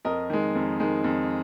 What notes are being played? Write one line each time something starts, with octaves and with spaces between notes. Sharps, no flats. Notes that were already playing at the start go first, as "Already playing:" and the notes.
F2 A#4 D#5
D#3 G#3
F2
D#3 G#3
F2